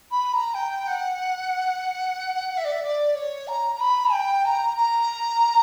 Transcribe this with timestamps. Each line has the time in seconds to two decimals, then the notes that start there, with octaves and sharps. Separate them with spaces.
0.11 B5
0.33 A#5
0.54 G5
0.87 F#5
2.50 F#5
2.57 E5
2.64 D5
2.72 E5
2.83 D5
3.15 C#5
3.48 A#5
3.75 A#5
3.80 B5
4.12 G5
4.45 A#5
4.77 A#5